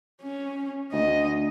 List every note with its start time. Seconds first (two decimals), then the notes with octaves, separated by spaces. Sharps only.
0.22 C#4
0.92 D2 D#5